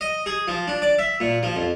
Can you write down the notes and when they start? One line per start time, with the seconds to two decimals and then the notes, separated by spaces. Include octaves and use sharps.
0.01 D#5
0.26 G#4
0.48 F3
0.68 D4
0.82 D5
0.99 E5
1.20 A#2
1.43 F3
1.56 F2